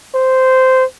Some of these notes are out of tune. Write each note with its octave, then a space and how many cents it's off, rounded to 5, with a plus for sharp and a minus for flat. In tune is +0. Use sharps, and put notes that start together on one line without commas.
C5 -10